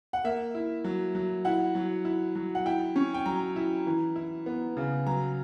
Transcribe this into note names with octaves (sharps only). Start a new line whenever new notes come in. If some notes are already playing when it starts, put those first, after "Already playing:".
F#5
A#3 E5
E4
F#3
F#3
E4 F#5
F#3
E4
F#3
F#5
E4 G5
C#4
G5
F#3 A#5
E4
E3
E4
B3
C#3
F#3 A#5